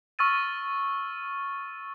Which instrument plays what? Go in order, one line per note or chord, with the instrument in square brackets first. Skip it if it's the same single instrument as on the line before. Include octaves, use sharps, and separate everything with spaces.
[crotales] C#6 E6 F6 A6 D#7